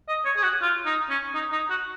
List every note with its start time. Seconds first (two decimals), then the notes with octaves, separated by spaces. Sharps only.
0.08 D#5
0.25 C#5
0.37 G#4
0.43 F#4
0.62 F4
0.86 D#4
1.10 C#4
1.34 D#4
1.52 D#4
1.70 F#4